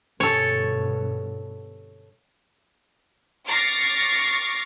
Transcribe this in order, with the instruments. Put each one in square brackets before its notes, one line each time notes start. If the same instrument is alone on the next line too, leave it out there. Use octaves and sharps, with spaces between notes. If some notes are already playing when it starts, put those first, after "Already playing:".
[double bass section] G2 B2 D3 [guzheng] A4 C#5
[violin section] C#6 D6 F6 A6 A#6 C7